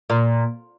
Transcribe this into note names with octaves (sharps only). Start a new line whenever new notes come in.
A#2